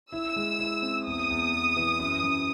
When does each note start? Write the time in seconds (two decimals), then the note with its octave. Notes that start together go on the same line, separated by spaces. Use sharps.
0.13 E4 E6
0.36 G#3
0.60 E4
0.82 C4
1.06 E2 D#6
1.30 E2
1.53 E2
1.77 E3
1.99 F#2
2.23 F#2